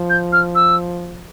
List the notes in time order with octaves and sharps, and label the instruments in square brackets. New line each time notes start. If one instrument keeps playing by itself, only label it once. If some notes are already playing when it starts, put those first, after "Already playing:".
Already playing: [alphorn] F3
[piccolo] G6
F6
E6